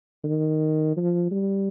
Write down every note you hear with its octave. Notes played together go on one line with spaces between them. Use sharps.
D#3
F3
G3